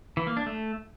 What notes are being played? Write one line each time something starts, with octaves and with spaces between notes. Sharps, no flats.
E3
A#3
D4
A3